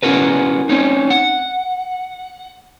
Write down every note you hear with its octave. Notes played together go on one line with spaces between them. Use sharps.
C#4 E4 F#4 A#4 B4
C4 C#4 D#4
F#5